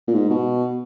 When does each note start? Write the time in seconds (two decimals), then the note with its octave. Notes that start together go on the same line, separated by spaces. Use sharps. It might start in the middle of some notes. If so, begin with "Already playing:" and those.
0.08 A#2
0.14 G#2
0.30 B2